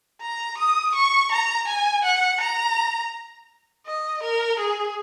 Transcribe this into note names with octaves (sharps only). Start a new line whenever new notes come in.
A#5
D#6
C#6
A#5
G#5
F#5
A#5
D#5
A#4
G#4